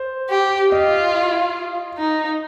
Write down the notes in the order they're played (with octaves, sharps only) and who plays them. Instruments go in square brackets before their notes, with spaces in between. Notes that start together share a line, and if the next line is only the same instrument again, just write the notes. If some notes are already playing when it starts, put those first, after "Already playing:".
Already playing: [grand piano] C5
[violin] G4
[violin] F4 [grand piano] D#5
[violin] D#4